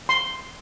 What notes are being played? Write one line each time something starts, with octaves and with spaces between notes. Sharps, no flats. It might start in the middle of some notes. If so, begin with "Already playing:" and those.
C6